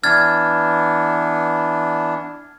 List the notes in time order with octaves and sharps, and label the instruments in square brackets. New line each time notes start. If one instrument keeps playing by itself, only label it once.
[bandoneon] E3 B3 D4 [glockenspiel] F6 G#6 A6